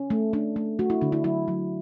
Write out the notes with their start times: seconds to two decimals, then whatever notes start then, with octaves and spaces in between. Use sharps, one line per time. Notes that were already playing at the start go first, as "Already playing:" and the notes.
Already playing: C#4
0.10 A3
0.33 A3 D4
0.56 A3
0.79 A3 F#4
0.90 E4
1.01 D3 D4
1.12 E4
1.24 F#3 E4
1.48 F#3